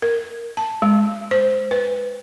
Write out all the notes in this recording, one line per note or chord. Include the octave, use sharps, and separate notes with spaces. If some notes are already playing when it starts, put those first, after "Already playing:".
A#4
A5
G#3
C5
B4